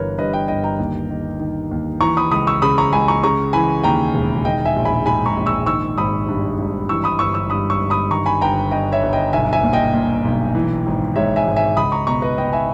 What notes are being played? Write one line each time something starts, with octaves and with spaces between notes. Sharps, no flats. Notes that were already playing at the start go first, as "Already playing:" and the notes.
Already playing: G1 E3 A#4 B4 C#5
G2 B4 D#5
D#5 G5
G1 D#5 G5
G5 A#5
D#2
D#3
D#3
D#2
E3 A#5 C#6
B5 D#6
C#2 B5 D#6
C#6 E6
C#3 B5 D#6
A#5 C#6
C#2 G#5 B5
A#5 C#6
C#3 A#5 C#6
E3 G#5 B5
D#2 G5 A#5
E1
D#3 D#5 G5
E5 G#5
A#1
G#5 B5
G#2 G#5 B5
A#5 C#6
A#1
C#6 E6
D#3 C#6 E6
G#1 B5 D#6
G2
G#1
E3 C#6 E6
B5 D#6
G1 C#6 E6
C#6 E6
G2 B5 D#6
C#6 E6
G1
B5 D#6
D#3 A#5 C#6
G#5 B5
G1 G5 A#5
G2 D#5 G5
C#5 E5
G1
D#5 G5
B1 E5 G#5
E5 G#5
A#2
D#5 G5
A#2
B1
E3
G#1
G#2 C#5 E5
E5 G#5
G#1
E5 G#5
C#2 B5 D#6
A#5 C#6
B2 A#5 C#6
B4 D#5
B2 D#5 G5
E5 G#5